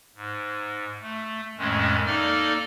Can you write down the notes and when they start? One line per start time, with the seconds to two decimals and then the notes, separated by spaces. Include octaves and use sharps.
0.16 G#2
1.02 A3
1.58 F2 A2 D#3 G#3 A3 C#4
2.06 A#3 D#4 A4 D5 F6